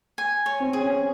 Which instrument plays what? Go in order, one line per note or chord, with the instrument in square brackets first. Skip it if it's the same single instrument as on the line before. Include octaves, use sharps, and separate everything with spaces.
[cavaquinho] G#5
C#5
[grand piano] C4
[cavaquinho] G#4
[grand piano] C#4